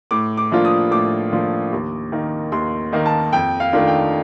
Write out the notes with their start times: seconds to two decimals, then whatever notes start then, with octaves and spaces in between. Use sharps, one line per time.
0.11 A2 D6
0.37 D6
0.52 F3 A#3 D4 F4
0.65 D#6
0.91 A2 D6
1.32 F3 A#3 D4 F4
1.72 D#2
2.12 D#3 A#3 D#4
2.52 D#2 C6
2.92 D#3 A#3 D#4
3.06 A5
3.33 F2 G5
3.60 F5
3.73 D#3 A3 D4 F4
3.87 G5